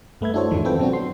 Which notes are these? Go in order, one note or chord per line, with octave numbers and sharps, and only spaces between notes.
G2 A3 B4 E5 G#6
D4 E4 F#4 A4 C5 C#5
F2 G#2 D#3 E3 G#3
C4 F4 A4 B4 G5
B2 F#3 C4 D4 F#4
C6